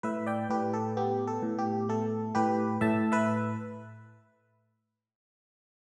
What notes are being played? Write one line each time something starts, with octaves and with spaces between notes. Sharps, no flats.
A2 B4 E5
D5 G5
A2 G4 B4
A4
B3 G4
A4
A2
G4
A3 A4
A2 G4 B4
A2 E5 A5
B4 E5